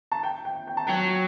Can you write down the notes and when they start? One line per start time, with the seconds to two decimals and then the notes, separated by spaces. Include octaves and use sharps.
0.12 A5
0.23 G5
0.45 G5
0.67 G5
0.77 A5
0.87 F#3 G5